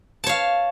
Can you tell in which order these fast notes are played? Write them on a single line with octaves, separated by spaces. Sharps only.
A5 C#5 F5